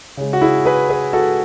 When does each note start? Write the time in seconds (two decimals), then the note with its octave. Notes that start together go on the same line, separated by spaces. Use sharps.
0.17 C#3 G#3
0.33 F#4
0.41 E4 G#4
0.65 G#4 B4
0.89 G#4 B4
1.13 F#4 A4